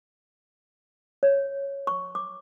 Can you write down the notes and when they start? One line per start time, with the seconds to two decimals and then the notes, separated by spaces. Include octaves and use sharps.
1.23 C#5
1.87 C#6
2.15 D6